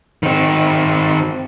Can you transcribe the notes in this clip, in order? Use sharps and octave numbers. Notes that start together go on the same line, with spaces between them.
D#3 C4